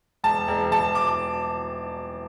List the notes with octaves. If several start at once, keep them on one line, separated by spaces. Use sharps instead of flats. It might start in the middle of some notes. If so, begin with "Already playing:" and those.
E1 A5
E1
E1 A5
D6